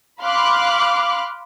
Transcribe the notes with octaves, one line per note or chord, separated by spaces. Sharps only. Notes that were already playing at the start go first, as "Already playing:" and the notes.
F5 B5 C6 D6 F6 F#6